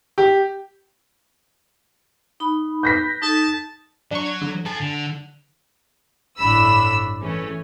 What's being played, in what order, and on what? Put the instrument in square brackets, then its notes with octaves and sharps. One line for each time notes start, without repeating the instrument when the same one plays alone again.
[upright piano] G4
[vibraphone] D#4 B5
[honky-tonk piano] G6 A#6 B6
[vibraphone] D#4 A4 [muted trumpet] A5
[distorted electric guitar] F#3 [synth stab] D4 C#6
[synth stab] G#6
D3
[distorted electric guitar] A4 G#5 [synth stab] A5
[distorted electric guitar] D3
[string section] G1 A2 D4 B5 E6
E3 A3 C#4